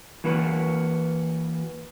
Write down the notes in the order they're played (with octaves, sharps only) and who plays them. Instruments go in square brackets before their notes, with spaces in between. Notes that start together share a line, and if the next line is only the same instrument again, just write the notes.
[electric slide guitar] E3 A#3 F#4 B4